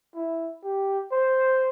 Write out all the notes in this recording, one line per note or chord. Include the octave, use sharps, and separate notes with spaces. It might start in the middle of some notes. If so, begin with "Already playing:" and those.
E4
G4
C5